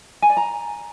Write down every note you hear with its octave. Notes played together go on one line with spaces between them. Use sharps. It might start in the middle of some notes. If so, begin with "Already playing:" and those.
G#5
D5
A#5